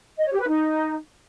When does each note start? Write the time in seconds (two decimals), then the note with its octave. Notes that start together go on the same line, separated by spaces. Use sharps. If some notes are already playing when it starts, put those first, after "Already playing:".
0.18 D#5
0.25 C#5
0.33 G4
0.40 B4
0.47 D#4